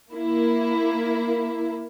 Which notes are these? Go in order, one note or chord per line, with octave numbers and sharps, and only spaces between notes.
A#3 E4